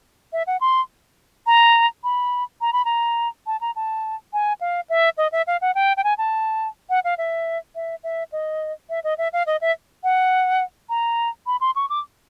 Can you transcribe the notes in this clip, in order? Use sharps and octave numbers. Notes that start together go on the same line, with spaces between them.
E5
F#5
C6
A#5
B5
A#5
B5
A#5
A5
A#5
A5
G#5
F5
E5
D#5
E5
F5
F#5
G5
G5
G#5
A5
F#5
F5
E5
E5
E5
D#5
E5
D#5
E5
F5
D#5
E5
F#5
A#5
B5
C6
C#6
D6